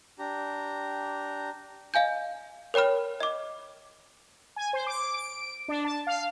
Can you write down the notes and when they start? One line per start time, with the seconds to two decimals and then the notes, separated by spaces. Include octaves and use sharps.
0.19 D4 G4 A#5
1.94 D#5 F5 G#5 G6
2.74 A#4 C#5 G5 B5 F6
3.20 D#5 D6
4.56 G#5
4.73 C5
4.87 D6
5.14 D7
5.68 D4
5.85 A5
6.07 F5